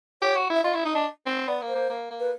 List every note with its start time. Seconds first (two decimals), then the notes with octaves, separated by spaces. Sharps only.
0.22 G4 C#5
0.36 F#4
0.50 E4
0.55 E5
0.64 F4 D#5
0.74 E4
0.85 D#4 D#5
0.95 D4
1.26 C4
1.47 B3 D5
1.62 A#3
1.68 C5
1.75 A#3
1.89 A#3
2.10 A#3
2.20 B4